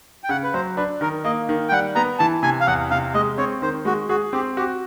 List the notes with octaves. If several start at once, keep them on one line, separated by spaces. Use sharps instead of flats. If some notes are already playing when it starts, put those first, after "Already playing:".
G5
C#3 F#5
B4
F#3 C5
D4 B4
D#3 A#4
A#3 D#5
D#3
G5
G3 F#5
B3 A#5
E3 A5
C3 G#5
F5
E2 F#5
C3 F5
G#3 D#5
C4 C#5
D#3 C5
G#3 F#4
F#4 G#4
C4 G4
F#4 G4